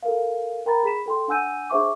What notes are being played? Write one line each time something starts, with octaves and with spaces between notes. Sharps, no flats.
A4 A#4 F5
A#4 G5 A#5 B5 A6
G#4 B5 B6 E7
A4 G5 C6
D4 F#5 G#5 E6 G6 D#7
D4 G#4 C5 E5 C#6 D6